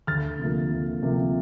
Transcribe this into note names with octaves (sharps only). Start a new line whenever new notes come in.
D2 F6 A6
C3 F3 A#3
D2
C3 F3 A#3